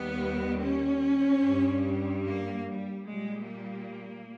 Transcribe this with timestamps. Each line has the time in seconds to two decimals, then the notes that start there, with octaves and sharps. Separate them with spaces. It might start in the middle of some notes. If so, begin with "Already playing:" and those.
Already playing: D#2 D#3 G3 B3
0.60 C#4
1.42 G2 G3
2.24 A#3
2.65 G3
3.06 A#2 G3 G#3
3.48 A#3